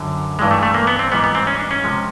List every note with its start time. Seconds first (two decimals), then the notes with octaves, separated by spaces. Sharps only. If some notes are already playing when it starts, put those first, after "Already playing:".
Already playing: F#2 D3 F#3
0.39 G2 E3 G#3
0.51 A3
0.63 A3
0.74 A#3
0.87 B3
0.99 C4
1.12 G#2 E3 G3 B3
1.24 B3
1.35 C4
1.47 C#4
1.59 D4
1.71 C#4
1.84 C3 F3 G#3